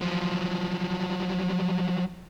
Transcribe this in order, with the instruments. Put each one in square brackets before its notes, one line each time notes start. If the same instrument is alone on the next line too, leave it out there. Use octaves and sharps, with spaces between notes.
[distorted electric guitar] F3 F#3